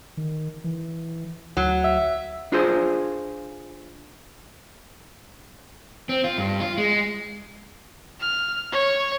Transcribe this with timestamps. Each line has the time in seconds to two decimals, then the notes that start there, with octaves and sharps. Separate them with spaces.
0.17 D#3
0.64 E3
1.57 D2 F#3
1.85 E5
2.52 D4 F4 G#4 C5
6.09 C4
6.24 F4
6.38 G2
6.60 F4
6.78 G#3
8.21 F6
8.72 C#5